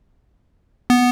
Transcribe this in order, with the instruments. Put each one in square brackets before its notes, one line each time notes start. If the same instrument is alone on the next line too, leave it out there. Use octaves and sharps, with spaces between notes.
[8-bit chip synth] B3